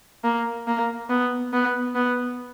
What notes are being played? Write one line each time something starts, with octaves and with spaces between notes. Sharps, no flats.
A#3
A#3
B3
B3
B3